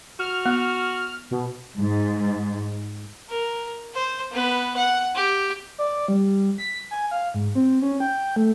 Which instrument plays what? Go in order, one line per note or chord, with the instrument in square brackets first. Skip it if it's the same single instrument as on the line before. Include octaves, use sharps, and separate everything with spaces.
[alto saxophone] F#4 [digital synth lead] F6
[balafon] B3
[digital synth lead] B2
[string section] G#2
[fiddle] A#4
C5
B3 B4
F#5
G4
[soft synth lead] D5
G3
B6
G#5
F5
G#2
C4
C#4
G5
A3